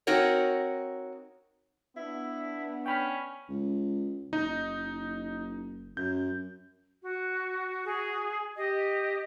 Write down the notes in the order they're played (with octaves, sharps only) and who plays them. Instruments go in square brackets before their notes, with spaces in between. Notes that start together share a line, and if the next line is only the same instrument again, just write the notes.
[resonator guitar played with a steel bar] C4 D#4 F#4 A#4 C#5
[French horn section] B3 D4 [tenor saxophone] E4
[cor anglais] C#4 [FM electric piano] G5 B5 F6
[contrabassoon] C#2
[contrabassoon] F#1 [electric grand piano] D#4
[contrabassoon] F#2 [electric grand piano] G6
[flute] F#4
[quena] G#4
[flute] G4 [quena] D#5